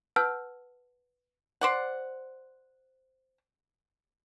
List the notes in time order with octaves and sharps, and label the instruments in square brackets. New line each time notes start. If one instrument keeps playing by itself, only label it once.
[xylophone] B4 F#5 A5 E6 F6 G6
[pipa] C5 D5 F#5